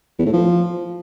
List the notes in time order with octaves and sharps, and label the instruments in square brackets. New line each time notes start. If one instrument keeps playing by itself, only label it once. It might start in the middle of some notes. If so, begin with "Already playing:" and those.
[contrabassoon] E2
A2
F3